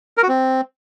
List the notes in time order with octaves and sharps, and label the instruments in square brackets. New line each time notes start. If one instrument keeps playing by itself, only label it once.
[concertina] A#4
F#4
C4